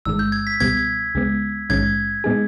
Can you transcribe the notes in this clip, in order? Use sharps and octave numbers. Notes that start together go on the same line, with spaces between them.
G1 G2 D#3 G#3 E6
G6
G#6
B6
C#2 B2 G3 B3 G#6
C#2 C#3 G#3 B3
A#1 G#2 D#3 G#3 C#4 G#6
A#2 G#3 B3 D#4 G#4